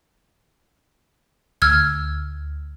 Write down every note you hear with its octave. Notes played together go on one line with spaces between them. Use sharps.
D2 E6 F6 G#6